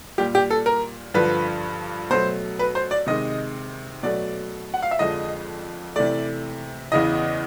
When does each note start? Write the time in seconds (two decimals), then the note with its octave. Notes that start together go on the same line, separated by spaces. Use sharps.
0.18 A#2 G3 G4
0.35 G4
0.51 A4
0.66 A#4
1.14 G2 D3 F3 B4
2.10 B2 F#3 A3 C5
2.59 B4
2.75 C5
2.91 D5
3.07 C3 D#3 G#3 D#5
4.03 B2 F#3 A3 D5
4.74 F#5
4.82 F5
4.91 E5
4.99 F2 D3 F3 G#3 D#5
5.96 C3 E3 A3 D5
6.92 E2 C#3 E3 D#5